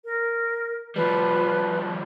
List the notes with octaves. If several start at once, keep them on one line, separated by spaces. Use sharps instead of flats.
A#4
F3 G3 B4